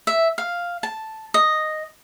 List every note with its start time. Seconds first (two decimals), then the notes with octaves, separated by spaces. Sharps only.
0.07 E5
0.38 F5
0.83 A5
1.34 D#5